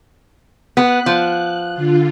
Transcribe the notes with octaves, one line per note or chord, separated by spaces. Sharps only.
B3 F#6
F3
D3 F4